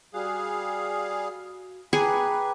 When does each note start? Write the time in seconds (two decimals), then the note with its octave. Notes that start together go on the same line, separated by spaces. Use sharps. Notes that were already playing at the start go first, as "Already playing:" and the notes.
0.14 G3 F#4 G#4 F5
1.93 G#4 B4 G5 A#5 D6